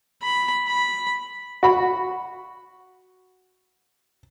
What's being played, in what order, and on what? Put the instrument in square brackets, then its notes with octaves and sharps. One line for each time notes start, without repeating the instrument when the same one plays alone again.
[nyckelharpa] B5
B5
[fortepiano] F#4 B5